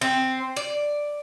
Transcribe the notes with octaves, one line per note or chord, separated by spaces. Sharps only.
C4
D5